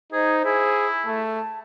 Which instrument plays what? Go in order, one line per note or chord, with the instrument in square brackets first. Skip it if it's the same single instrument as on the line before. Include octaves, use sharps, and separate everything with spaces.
[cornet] D#4 [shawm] G#4 [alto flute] C5
[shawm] E4 [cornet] G#4
[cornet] A3 [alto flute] A5